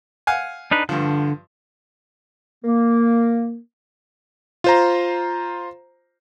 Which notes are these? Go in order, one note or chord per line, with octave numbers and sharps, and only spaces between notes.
F5 F#5 G#5
D4 D#4 B4
G2 D3 F3
A#3
F4 C5 A#5